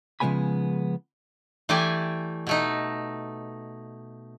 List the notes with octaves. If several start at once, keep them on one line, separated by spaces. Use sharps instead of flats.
C#3 F3 G#3 B3 G#5 B5
E3 A3 G4 D5 G5 G#5
B2 A3 D#4